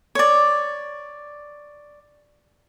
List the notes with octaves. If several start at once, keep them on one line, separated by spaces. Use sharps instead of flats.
C#5 D5